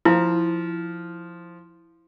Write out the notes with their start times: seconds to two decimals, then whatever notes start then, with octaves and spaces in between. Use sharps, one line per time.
0.05 F3 E4